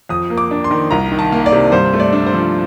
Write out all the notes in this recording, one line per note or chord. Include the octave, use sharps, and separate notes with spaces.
F2 D#6
A#3
D6
D4
C6
D#3
C2 A#5
D#3
A5
A#3
D5
C3
G2 C5
A3
D5
D4
C5
F3